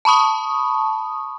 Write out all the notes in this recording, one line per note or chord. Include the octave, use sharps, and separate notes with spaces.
A5 B5 C#6 D#6